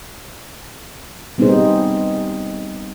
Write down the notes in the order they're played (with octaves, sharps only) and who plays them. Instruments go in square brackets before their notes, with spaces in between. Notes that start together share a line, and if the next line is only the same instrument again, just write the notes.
[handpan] G3 B3 C4 D#4 G#4 C5